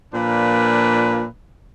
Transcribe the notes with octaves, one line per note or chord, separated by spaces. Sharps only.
A#2 F3 A#3 D4 B4